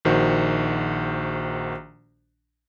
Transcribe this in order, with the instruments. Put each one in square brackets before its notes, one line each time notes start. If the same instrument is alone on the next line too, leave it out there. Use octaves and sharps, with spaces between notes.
[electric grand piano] A#1 D#3 F#4 C5